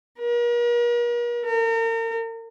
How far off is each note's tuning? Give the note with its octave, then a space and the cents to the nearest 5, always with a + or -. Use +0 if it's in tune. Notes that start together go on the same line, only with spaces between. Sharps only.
A#4 +40
A#4 -35